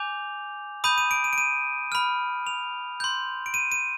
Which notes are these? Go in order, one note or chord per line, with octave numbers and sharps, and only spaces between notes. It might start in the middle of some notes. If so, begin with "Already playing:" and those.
Already playing: G#5 D6 G6 F7
B5 D#6 G6 D#7
D#7
D7
D#7
D7
D#7
B5 F6
F7
C6 G6
D7
D#7
D#7